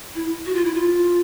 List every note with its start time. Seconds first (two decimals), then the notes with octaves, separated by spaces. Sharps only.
0.15 E4
0.46 F#4
0.55 F4
0.65 E4
0.74 F4